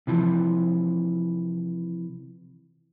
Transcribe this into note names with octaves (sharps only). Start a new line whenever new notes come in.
C3 E3 F3